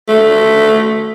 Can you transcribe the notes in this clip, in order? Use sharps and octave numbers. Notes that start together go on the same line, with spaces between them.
A3